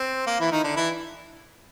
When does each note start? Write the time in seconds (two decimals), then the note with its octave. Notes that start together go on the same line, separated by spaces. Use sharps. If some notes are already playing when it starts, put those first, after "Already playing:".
Already playing: C4
0.27 A#3
0.40 E3 E4
0.52 D#3 D#4
0.64 D3 D4
0.76 E3 E4